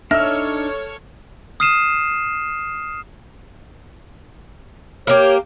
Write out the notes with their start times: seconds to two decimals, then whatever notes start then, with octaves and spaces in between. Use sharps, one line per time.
0.11 D4 D#4 A4 C#5 E5 E6 F6
1.60 D#6 F6 C7 D#7 E7
5.07 A#3 G4 C#5